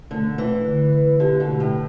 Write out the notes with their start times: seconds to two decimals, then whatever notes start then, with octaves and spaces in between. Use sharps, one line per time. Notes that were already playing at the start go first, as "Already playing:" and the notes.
0.11 D3 A3
0.38 E3 A3
0.66 D3
0.93 B4
1.20 D3 G4
1.40 B2
1.47 A3
1.60 A2